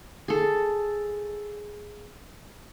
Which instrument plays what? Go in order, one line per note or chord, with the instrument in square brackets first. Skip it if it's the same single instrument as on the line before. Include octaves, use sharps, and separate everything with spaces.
[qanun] G#4 A4